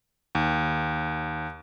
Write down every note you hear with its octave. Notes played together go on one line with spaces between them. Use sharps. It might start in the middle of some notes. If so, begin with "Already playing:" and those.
D#2